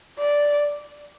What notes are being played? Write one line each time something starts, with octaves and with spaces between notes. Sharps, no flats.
D5